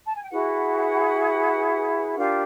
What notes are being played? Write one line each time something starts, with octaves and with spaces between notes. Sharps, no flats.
A5
G#5
G5
E4 F#4 G#4 B4 F#5
D4 F4 G4 A#4 F5